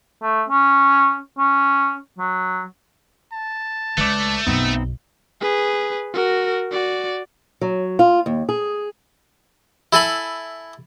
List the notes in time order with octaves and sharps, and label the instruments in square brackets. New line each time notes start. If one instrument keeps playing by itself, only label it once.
[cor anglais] A3
C#4
C#4
F#3
[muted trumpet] A5
[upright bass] C#2 [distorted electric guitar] A3 [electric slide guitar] B4 D5
[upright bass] B1 F#2 [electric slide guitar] B3 C4 D#4
[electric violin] G#4 B4
F#4 A#4
F#4 D5
[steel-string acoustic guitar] F#3
F4
D#2
G#4
[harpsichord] E4 A4 G#5 B5